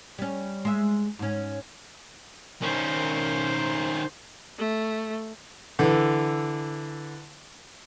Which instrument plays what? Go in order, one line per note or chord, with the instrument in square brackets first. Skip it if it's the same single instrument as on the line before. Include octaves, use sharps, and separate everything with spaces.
[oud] G3 C#4
G#3 E5
G#2 C#4
[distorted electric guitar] D#3 C#4 [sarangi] C5
[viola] A3
[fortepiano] D3 E3